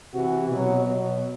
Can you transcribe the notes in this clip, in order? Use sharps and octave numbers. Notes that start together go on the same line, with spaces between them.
C3 E3 F#4
B2 F#3
B2 F#3